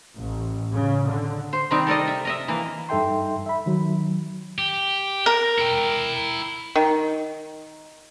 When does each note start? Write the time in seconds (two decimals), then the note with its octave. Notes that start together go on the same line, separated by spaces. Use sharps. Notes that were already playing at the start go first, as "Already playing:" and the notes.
0.16 A1
0.74 C#3
1.09 D3
1.53 C5
1.71 C3 D#3 G3 C4 D#4 G4
1.87 A4 A#4 D5 D#5
2.08 E5
2.25 A#4 D#5 E5
2.48 E3 A#3
2.89 G2 D#4 A4 E5 G5 C6
3.46 E5 B5
3.66 D#3 F#3
4.58 G4
5.26 A#4
5.58 E4 G5
6.75 D#3